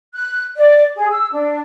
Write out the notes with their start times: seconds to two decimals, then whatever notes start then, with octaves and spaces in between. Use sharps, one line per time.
0.15 F#6
0.56 D5
0.96 G#4
1.11 E6
1.31 D4